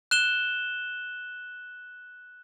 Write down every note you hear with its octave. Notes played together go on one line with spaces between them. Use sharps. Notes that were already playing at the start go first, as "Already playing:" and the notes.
F#6 E7 G7